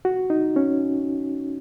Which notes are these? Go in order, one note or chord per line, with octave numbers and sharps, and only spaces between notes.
F#4
D#4
C#4